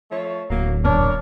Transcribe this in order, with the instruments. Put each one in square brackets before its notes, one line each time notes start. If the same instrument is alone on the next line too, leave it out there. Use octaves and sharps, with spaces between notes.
[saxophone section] F3 A3 C#5
[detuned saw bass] D1 [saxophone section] F#3 A#3
[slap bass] F#2 A#2 B3 [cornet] D4 [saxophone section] A#4 C#5